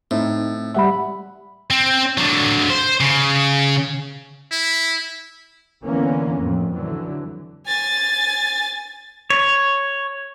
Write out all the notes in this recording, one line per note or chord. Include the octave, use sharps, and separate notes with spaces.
A2 C4 D#4
G3 E5 F#5 B5
C4
D3 F#3
C5
C#3
E4
D3 E3 A#3 B3 C#4
F2 A2
D3 E3 F#3
G#5 A6
C#5